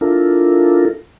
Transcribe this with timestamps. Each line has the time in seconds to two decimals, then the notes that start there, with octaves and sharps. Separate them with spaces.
0.01 D4 E4 F4 A4 A#4